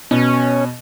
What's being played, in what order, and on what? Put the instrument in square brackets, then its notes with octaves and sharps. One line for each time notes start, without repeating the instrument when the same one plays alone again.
[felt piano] B2 [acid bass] C#4